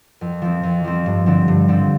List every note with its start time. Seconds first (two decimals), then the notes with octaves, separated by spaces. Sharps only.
0.21 F2
0.42 F3 C4
0.63 F2
0.84 F3 C4
1.06 G2
1.26 D3 F3 C4
1.48 G2
1.68 D3 F3 C4